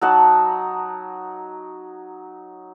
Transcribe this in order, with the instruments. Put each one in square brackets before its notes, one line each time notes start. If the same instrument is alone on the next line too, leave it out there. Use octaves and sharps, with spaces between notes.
[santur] F#3 D#4 F#5 A5